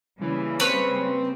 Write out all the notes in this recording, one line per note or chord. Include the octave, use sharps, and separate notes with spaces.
C#3 E3 G3 A#3
C4 B4 C#5